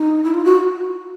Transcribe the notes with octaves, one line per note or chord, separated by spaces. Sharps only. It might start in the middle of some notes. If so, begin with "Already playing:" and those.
Already playing: D#4
E4
F4
F#4